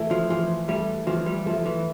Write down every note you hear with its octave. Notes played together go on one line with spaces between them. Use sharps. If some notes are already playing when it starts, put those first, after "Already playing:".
Already playing: E3 A3 E4
F3
E3 F3
G3 A3 E4
E3 F3
G3
F3 A3 E4
E3